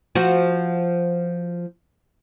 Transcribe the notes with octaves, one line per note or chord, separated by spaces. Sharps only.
F3 F#4